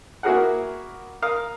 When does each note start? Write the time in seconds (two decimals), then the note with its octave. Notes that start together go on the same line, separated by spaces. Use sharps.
0.23 A#3 E4 F#4 G#4 A#4 F#5
1.22 A#4 F5 D#6